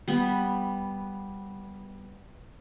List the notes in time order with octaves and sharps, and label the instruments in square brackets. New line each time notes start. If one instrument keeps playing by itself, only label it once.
[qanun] G3 B3